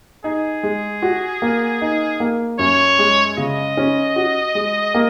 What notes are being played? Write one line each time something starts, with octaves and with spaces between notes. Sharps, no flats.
D#4 G#4
G#3
F#4
A#3
D#4
A#3
F#2 C#5
G#3
C#3 D#5
C#4
F#4
G#3
A#3